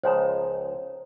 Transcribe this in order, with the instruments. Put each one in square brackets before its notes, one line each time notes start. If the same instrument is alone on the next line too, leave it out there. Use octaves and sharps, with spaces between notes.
[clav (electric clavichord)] C#2 F3 G#3 [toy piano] C5 C#5 A#5